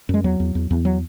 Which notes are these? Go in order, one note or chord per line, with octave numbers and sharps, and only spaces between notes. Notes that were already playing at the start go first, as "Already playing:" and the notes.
F#2 G#3
E2 F#3
E2
E2
E2
F#3